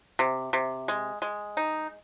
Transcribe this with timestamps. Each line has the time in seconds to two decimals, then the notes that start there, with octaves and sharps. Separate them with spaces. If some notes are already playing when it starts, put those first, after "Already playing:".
0.19 C3
0.53 C3
0.88 G#3
1.22 G#3
1.57 D#4